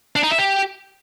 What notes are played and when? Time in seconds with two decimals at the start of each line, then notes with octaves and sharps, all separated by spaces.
0.16 D4
0.23 D#4
0.31 E5
0.38 G4